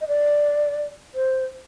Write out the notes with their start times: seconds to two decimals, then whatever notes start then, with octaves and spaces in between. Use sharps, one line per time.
0.01 D#5
0.08 D5
1.15 C5